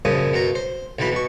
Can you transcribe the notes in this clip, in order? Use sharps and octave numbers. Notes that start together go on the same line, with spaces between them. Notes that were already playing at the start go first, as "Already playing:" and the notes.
A#1 F#2 A#2 C#3 F3 D#6
F#2 B2 F4 A#5
C5
B1 B2 E3 F4 B5
B2 C#6